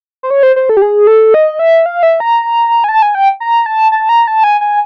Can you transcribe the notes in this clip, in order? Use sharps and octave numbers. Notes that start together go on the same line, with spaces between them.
C5
C#5
C5
C5
A4
G4
G#4
A4
D#5
E5
F5
E5
A#5
G#5
A5
G#5
G5
A#5
A5
A5
A#5
A5
G#5
G#5